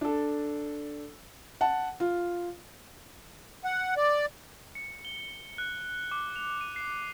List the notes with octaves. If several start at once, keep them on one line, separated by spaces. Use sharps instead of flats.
D4 A4
F#5 A5
F4
F#5
D5
C#7
G7
F#6
D6
F7
D#7
C7